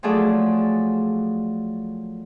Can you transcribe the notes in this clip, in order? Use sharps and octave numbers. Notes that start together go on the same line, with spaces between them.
F3 F#3 A3 G#4 A4 D5